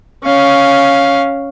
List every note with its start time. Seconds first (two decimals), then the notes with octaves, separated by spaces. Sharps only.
0.24 C#4 F5